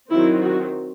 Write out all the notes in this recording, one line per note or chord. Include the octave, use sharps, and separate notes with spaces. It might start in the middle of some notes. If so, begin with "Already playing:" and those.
D#3 F#3 C4 E4
F#4